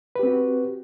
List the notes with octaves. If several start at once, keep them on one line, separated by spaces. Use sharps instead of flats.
C4 F#4 G4 B4